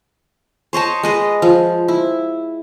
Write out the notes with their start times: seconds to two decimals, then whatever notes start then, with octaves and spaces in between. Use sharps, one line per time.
0.73 C5 C#5 D#5 A5
1.03 G#3 B4 D#5
1.42 F3
1.88 E4